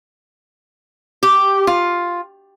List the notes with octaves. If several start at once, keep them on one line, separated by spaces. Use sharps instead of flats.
G4
F4